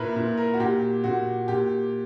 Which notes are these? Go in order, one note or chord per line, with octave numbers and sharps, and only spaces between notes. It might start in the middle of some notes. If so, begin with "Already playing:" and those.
Already playing: A#2 E4 A#4 B4
A#2
A#4
F#4
A#2 G4
A#2 F#4
A#2 G4